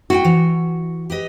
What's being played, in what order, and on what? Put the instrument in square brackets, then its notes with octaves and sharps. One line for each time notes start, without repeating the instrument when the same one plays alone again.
[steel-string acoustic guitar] E4 F5 G5 [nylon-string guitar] F#4
[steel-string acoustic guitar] E3
G4 B4 D#5